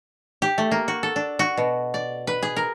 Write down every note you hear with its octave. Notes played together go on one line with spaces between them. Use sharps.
G4
A3
A#3
F#4
A4
D4
F#4
B2
D5
B4
G#4
A#4